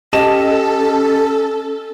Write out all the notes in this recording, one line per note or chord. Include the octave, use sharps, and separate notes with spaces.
C#4 G4 A4 D#5 A5 E7